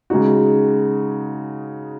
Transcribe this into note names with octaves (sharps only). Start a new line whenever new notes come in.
C#3 G#3 D#4 F#4